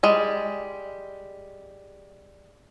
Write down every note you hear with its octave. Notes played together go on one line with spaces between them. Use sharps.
G3 G#3